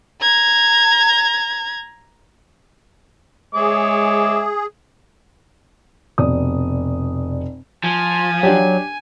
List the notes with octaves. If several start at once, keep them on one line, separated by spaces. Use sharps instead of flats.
A#5 G#6
G#3 G#4 C#5 E5 D6
F1 B2 D5 D#6
F3 G#5
F#3 D4 G4